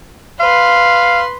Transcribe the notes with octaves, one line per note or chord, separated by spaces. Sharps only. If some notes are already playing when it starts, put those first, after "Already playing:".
B4 F5 C6